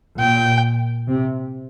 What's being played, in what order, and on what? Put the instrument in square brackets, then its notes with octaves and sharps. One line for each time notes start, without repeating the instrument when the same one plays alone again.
[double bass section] A#2 [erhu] G5
[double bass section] C3